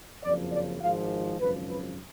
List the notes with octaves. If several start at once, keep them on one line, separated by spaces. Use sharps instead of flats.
F#1 F2 C#3 F3 D5
D5
G#1 G#2 F3 F5
G#1 F#2 C#3 F3 B4
B4